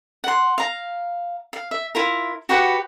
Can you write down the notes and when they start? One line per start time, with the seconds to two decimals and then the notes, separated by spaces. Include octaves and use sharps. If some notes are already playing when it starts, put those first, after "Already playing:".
0.24 F#5 C6
0.58 F5 A#5
1.53 F5
1.71 E5
1.95 E4 F4 A#4
2.49 F#4 G4 B4 F#5